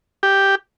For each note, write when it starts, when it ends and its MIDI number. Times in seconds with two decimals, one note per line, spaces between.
0.23 0.55 67